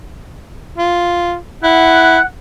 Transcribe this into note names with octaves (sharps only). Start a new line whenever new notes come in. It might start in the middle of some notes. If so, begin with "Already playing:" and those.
F4
E4 F#5